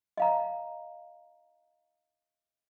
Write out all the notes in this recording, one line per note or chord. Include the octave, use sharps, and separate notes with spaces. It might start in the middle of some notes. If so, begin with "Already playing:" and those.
D#5 F5 A#5